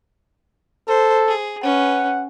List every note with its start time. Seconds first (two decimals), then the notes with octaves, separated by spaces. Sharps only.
0.88 A4 C5
1.28 G#4
1.63 C#4 B4 F#5